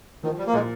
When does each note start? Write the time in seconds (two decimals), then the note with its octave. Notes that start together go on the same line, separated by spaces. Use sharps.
0.23 D#3 F3
0.38 G3
0.47 A#3
0.53 A#2 G#3